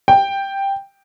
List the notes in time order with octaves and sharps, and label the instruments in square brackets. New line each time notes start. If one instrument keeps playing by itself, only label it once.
[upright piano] G5